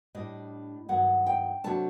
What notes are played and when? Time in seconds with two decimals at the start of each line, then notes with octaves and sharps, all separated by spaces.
0.15 A2 G3 D4 D#5
0.89 G2 D#3 F#3 F#5
1.27 G5
1.64 C3 F#3 A3 D4 A5